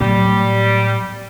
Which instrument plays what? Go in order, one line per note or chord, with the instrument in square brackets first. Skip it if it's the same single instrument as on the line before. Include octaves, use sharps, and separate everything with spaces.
[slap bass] A2 A3 B3 [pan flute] F#3 [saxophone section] G3